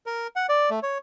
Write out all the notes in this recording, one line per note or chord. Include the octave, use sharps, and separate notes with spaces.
A#4
F#5
D5
A3
C#5